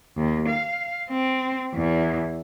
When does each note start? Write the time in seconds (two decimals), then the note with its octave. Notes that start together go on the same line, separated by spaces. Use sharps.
0.17 D#2
0.48 F5
1.10 C4
1.74 E2